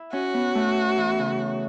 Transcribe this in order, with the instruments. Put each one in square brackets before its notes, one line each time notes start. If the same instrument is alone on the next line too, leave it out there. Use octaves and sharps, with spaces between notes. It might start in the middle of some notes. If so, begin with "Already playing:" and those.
Already playing: [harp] E4
[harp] C#4 [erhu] F#4
[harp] B3
A3
E3
C#3